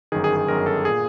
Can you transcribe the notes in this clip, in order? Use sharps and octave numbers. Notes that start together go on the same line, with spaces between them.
G1 F#2 D#3 G#4
G#4
G#4
G1 F#2 D#3 A#4
A4
A#2 G#4